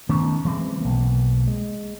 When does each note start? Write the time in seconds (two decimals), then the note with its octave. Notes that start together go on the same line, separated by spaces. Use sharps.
0.09 D#3 A3 B3 C#4
0.45 E3 G3 G#3 C4
0.81 B1 A#3
1.47 G#3